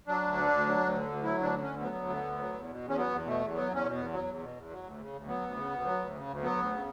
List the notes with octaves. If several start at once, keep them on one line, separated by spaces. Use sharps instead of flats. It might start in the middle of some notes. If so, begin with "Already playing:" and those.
F#3 D4
D2
D3
D2
F#3
D2
D3
D2
F#3 E4
D2 D4
D3
C#4
D2
F#3 B3
D2
D3
D2
F#3
E2
B2
E2
C#4
F#3 B3
E2
B2 A3
E2
F#3 B3
E2 C#4
B2
E2 B3
F#3
E2
B2
E2
F#3
D2
C#3
D2
F#3 B3
D2
C#3
D2
F#3
D2
C#3
D2
F#3 B3
D2
C#3